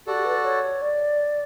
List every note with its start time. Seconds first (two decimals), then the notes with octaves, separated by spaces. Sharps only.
0.07 F#4 G4 A4 D5
0.17 G4
0.25 B4
0.44 C#5
0.82 D5